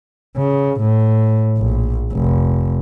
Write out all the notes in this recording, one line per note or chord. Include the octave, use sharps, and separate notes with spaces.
C#3
A2
A#1
F1